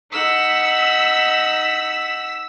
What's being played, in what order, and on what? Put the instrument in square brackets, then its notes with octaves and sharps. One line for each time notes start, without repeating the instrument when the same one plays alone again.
[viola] D#4 F#5 [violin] E6 B6